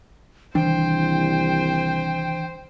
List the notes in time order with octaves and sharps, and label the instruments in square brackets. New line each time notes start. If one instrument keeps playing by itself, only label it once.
[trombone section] C2 [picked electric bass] D#3 E3 D4 [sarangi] C5 [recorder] G5